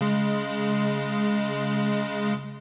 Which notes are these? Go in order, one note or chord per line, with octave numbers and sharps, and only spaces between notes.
C#3 G#3